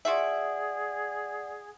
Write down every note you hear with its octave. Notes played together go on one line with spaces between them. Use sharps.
F4 F#4 G#4 D5 E5 F#5